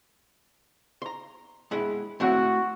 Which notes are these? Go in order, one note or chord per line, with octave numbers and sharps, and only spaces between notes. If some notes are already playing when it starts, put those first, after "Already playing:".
A#5 C6
G#3 B3 E4
A3 C4 E4 F#4